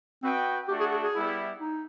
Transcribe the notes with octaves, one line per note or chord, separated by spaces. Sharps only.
C4 F#4 B4 D#5 G5
A3 D4 F#4 G4
G#4
G#4
G#4
G3 B3 E4
D#4